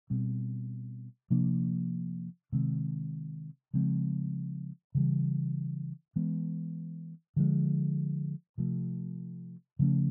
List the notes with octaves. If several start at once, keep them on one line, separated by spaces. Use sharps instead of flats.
B2 G3 C4
C3 F3 A#3 D4
C3 D#3 G#3 C4
C#3 F3 G#3 C4
C#3 E3 G3
E3 G#3 B3
D3 F3 G#3
C3 F3 A3
C#3 F3 A3 C#4